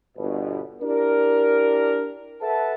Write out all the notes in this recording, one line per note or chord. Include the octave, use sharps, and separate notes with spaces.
G1 B2
D4 E4 G4 A#4
A4 B4 E5 F#5 A5